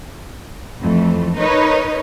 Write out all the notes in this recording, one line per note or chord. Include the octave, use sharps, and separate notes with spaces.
F2 E3 A3
D#4 A#4 B4 C#5 D#5